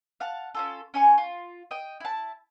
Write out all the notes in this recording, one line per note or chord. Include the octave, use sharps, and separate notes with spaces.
F5 F#5 A5
C#4 F4 A4
C#4 G#5 C#6
F4
D#5 G5
E4 A5